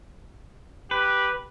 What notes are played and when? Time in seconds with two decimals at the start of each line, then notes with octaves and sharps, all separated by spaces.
0.91 G4 B4